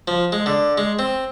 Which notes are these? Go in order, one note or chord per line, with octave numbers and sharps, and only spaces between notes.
F3
G#3
D3
G#3
C4